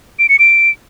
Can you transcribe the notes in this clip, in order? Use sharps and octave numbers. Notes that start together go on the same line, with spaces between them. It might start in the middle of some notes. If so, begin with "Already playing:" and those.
D7
C#7
D7